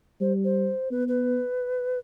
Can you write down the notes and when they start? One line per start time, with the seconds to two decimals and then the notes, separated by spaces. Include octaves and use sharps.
0.21 G3 C5
0.44 C5
0.91 B3 B4
1.08 B4